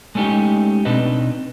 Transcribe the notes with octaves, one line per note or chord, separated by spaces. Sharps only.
G#3 A3 C#4 D#4 G4
B2 C4 D4 D#4 B4 D#5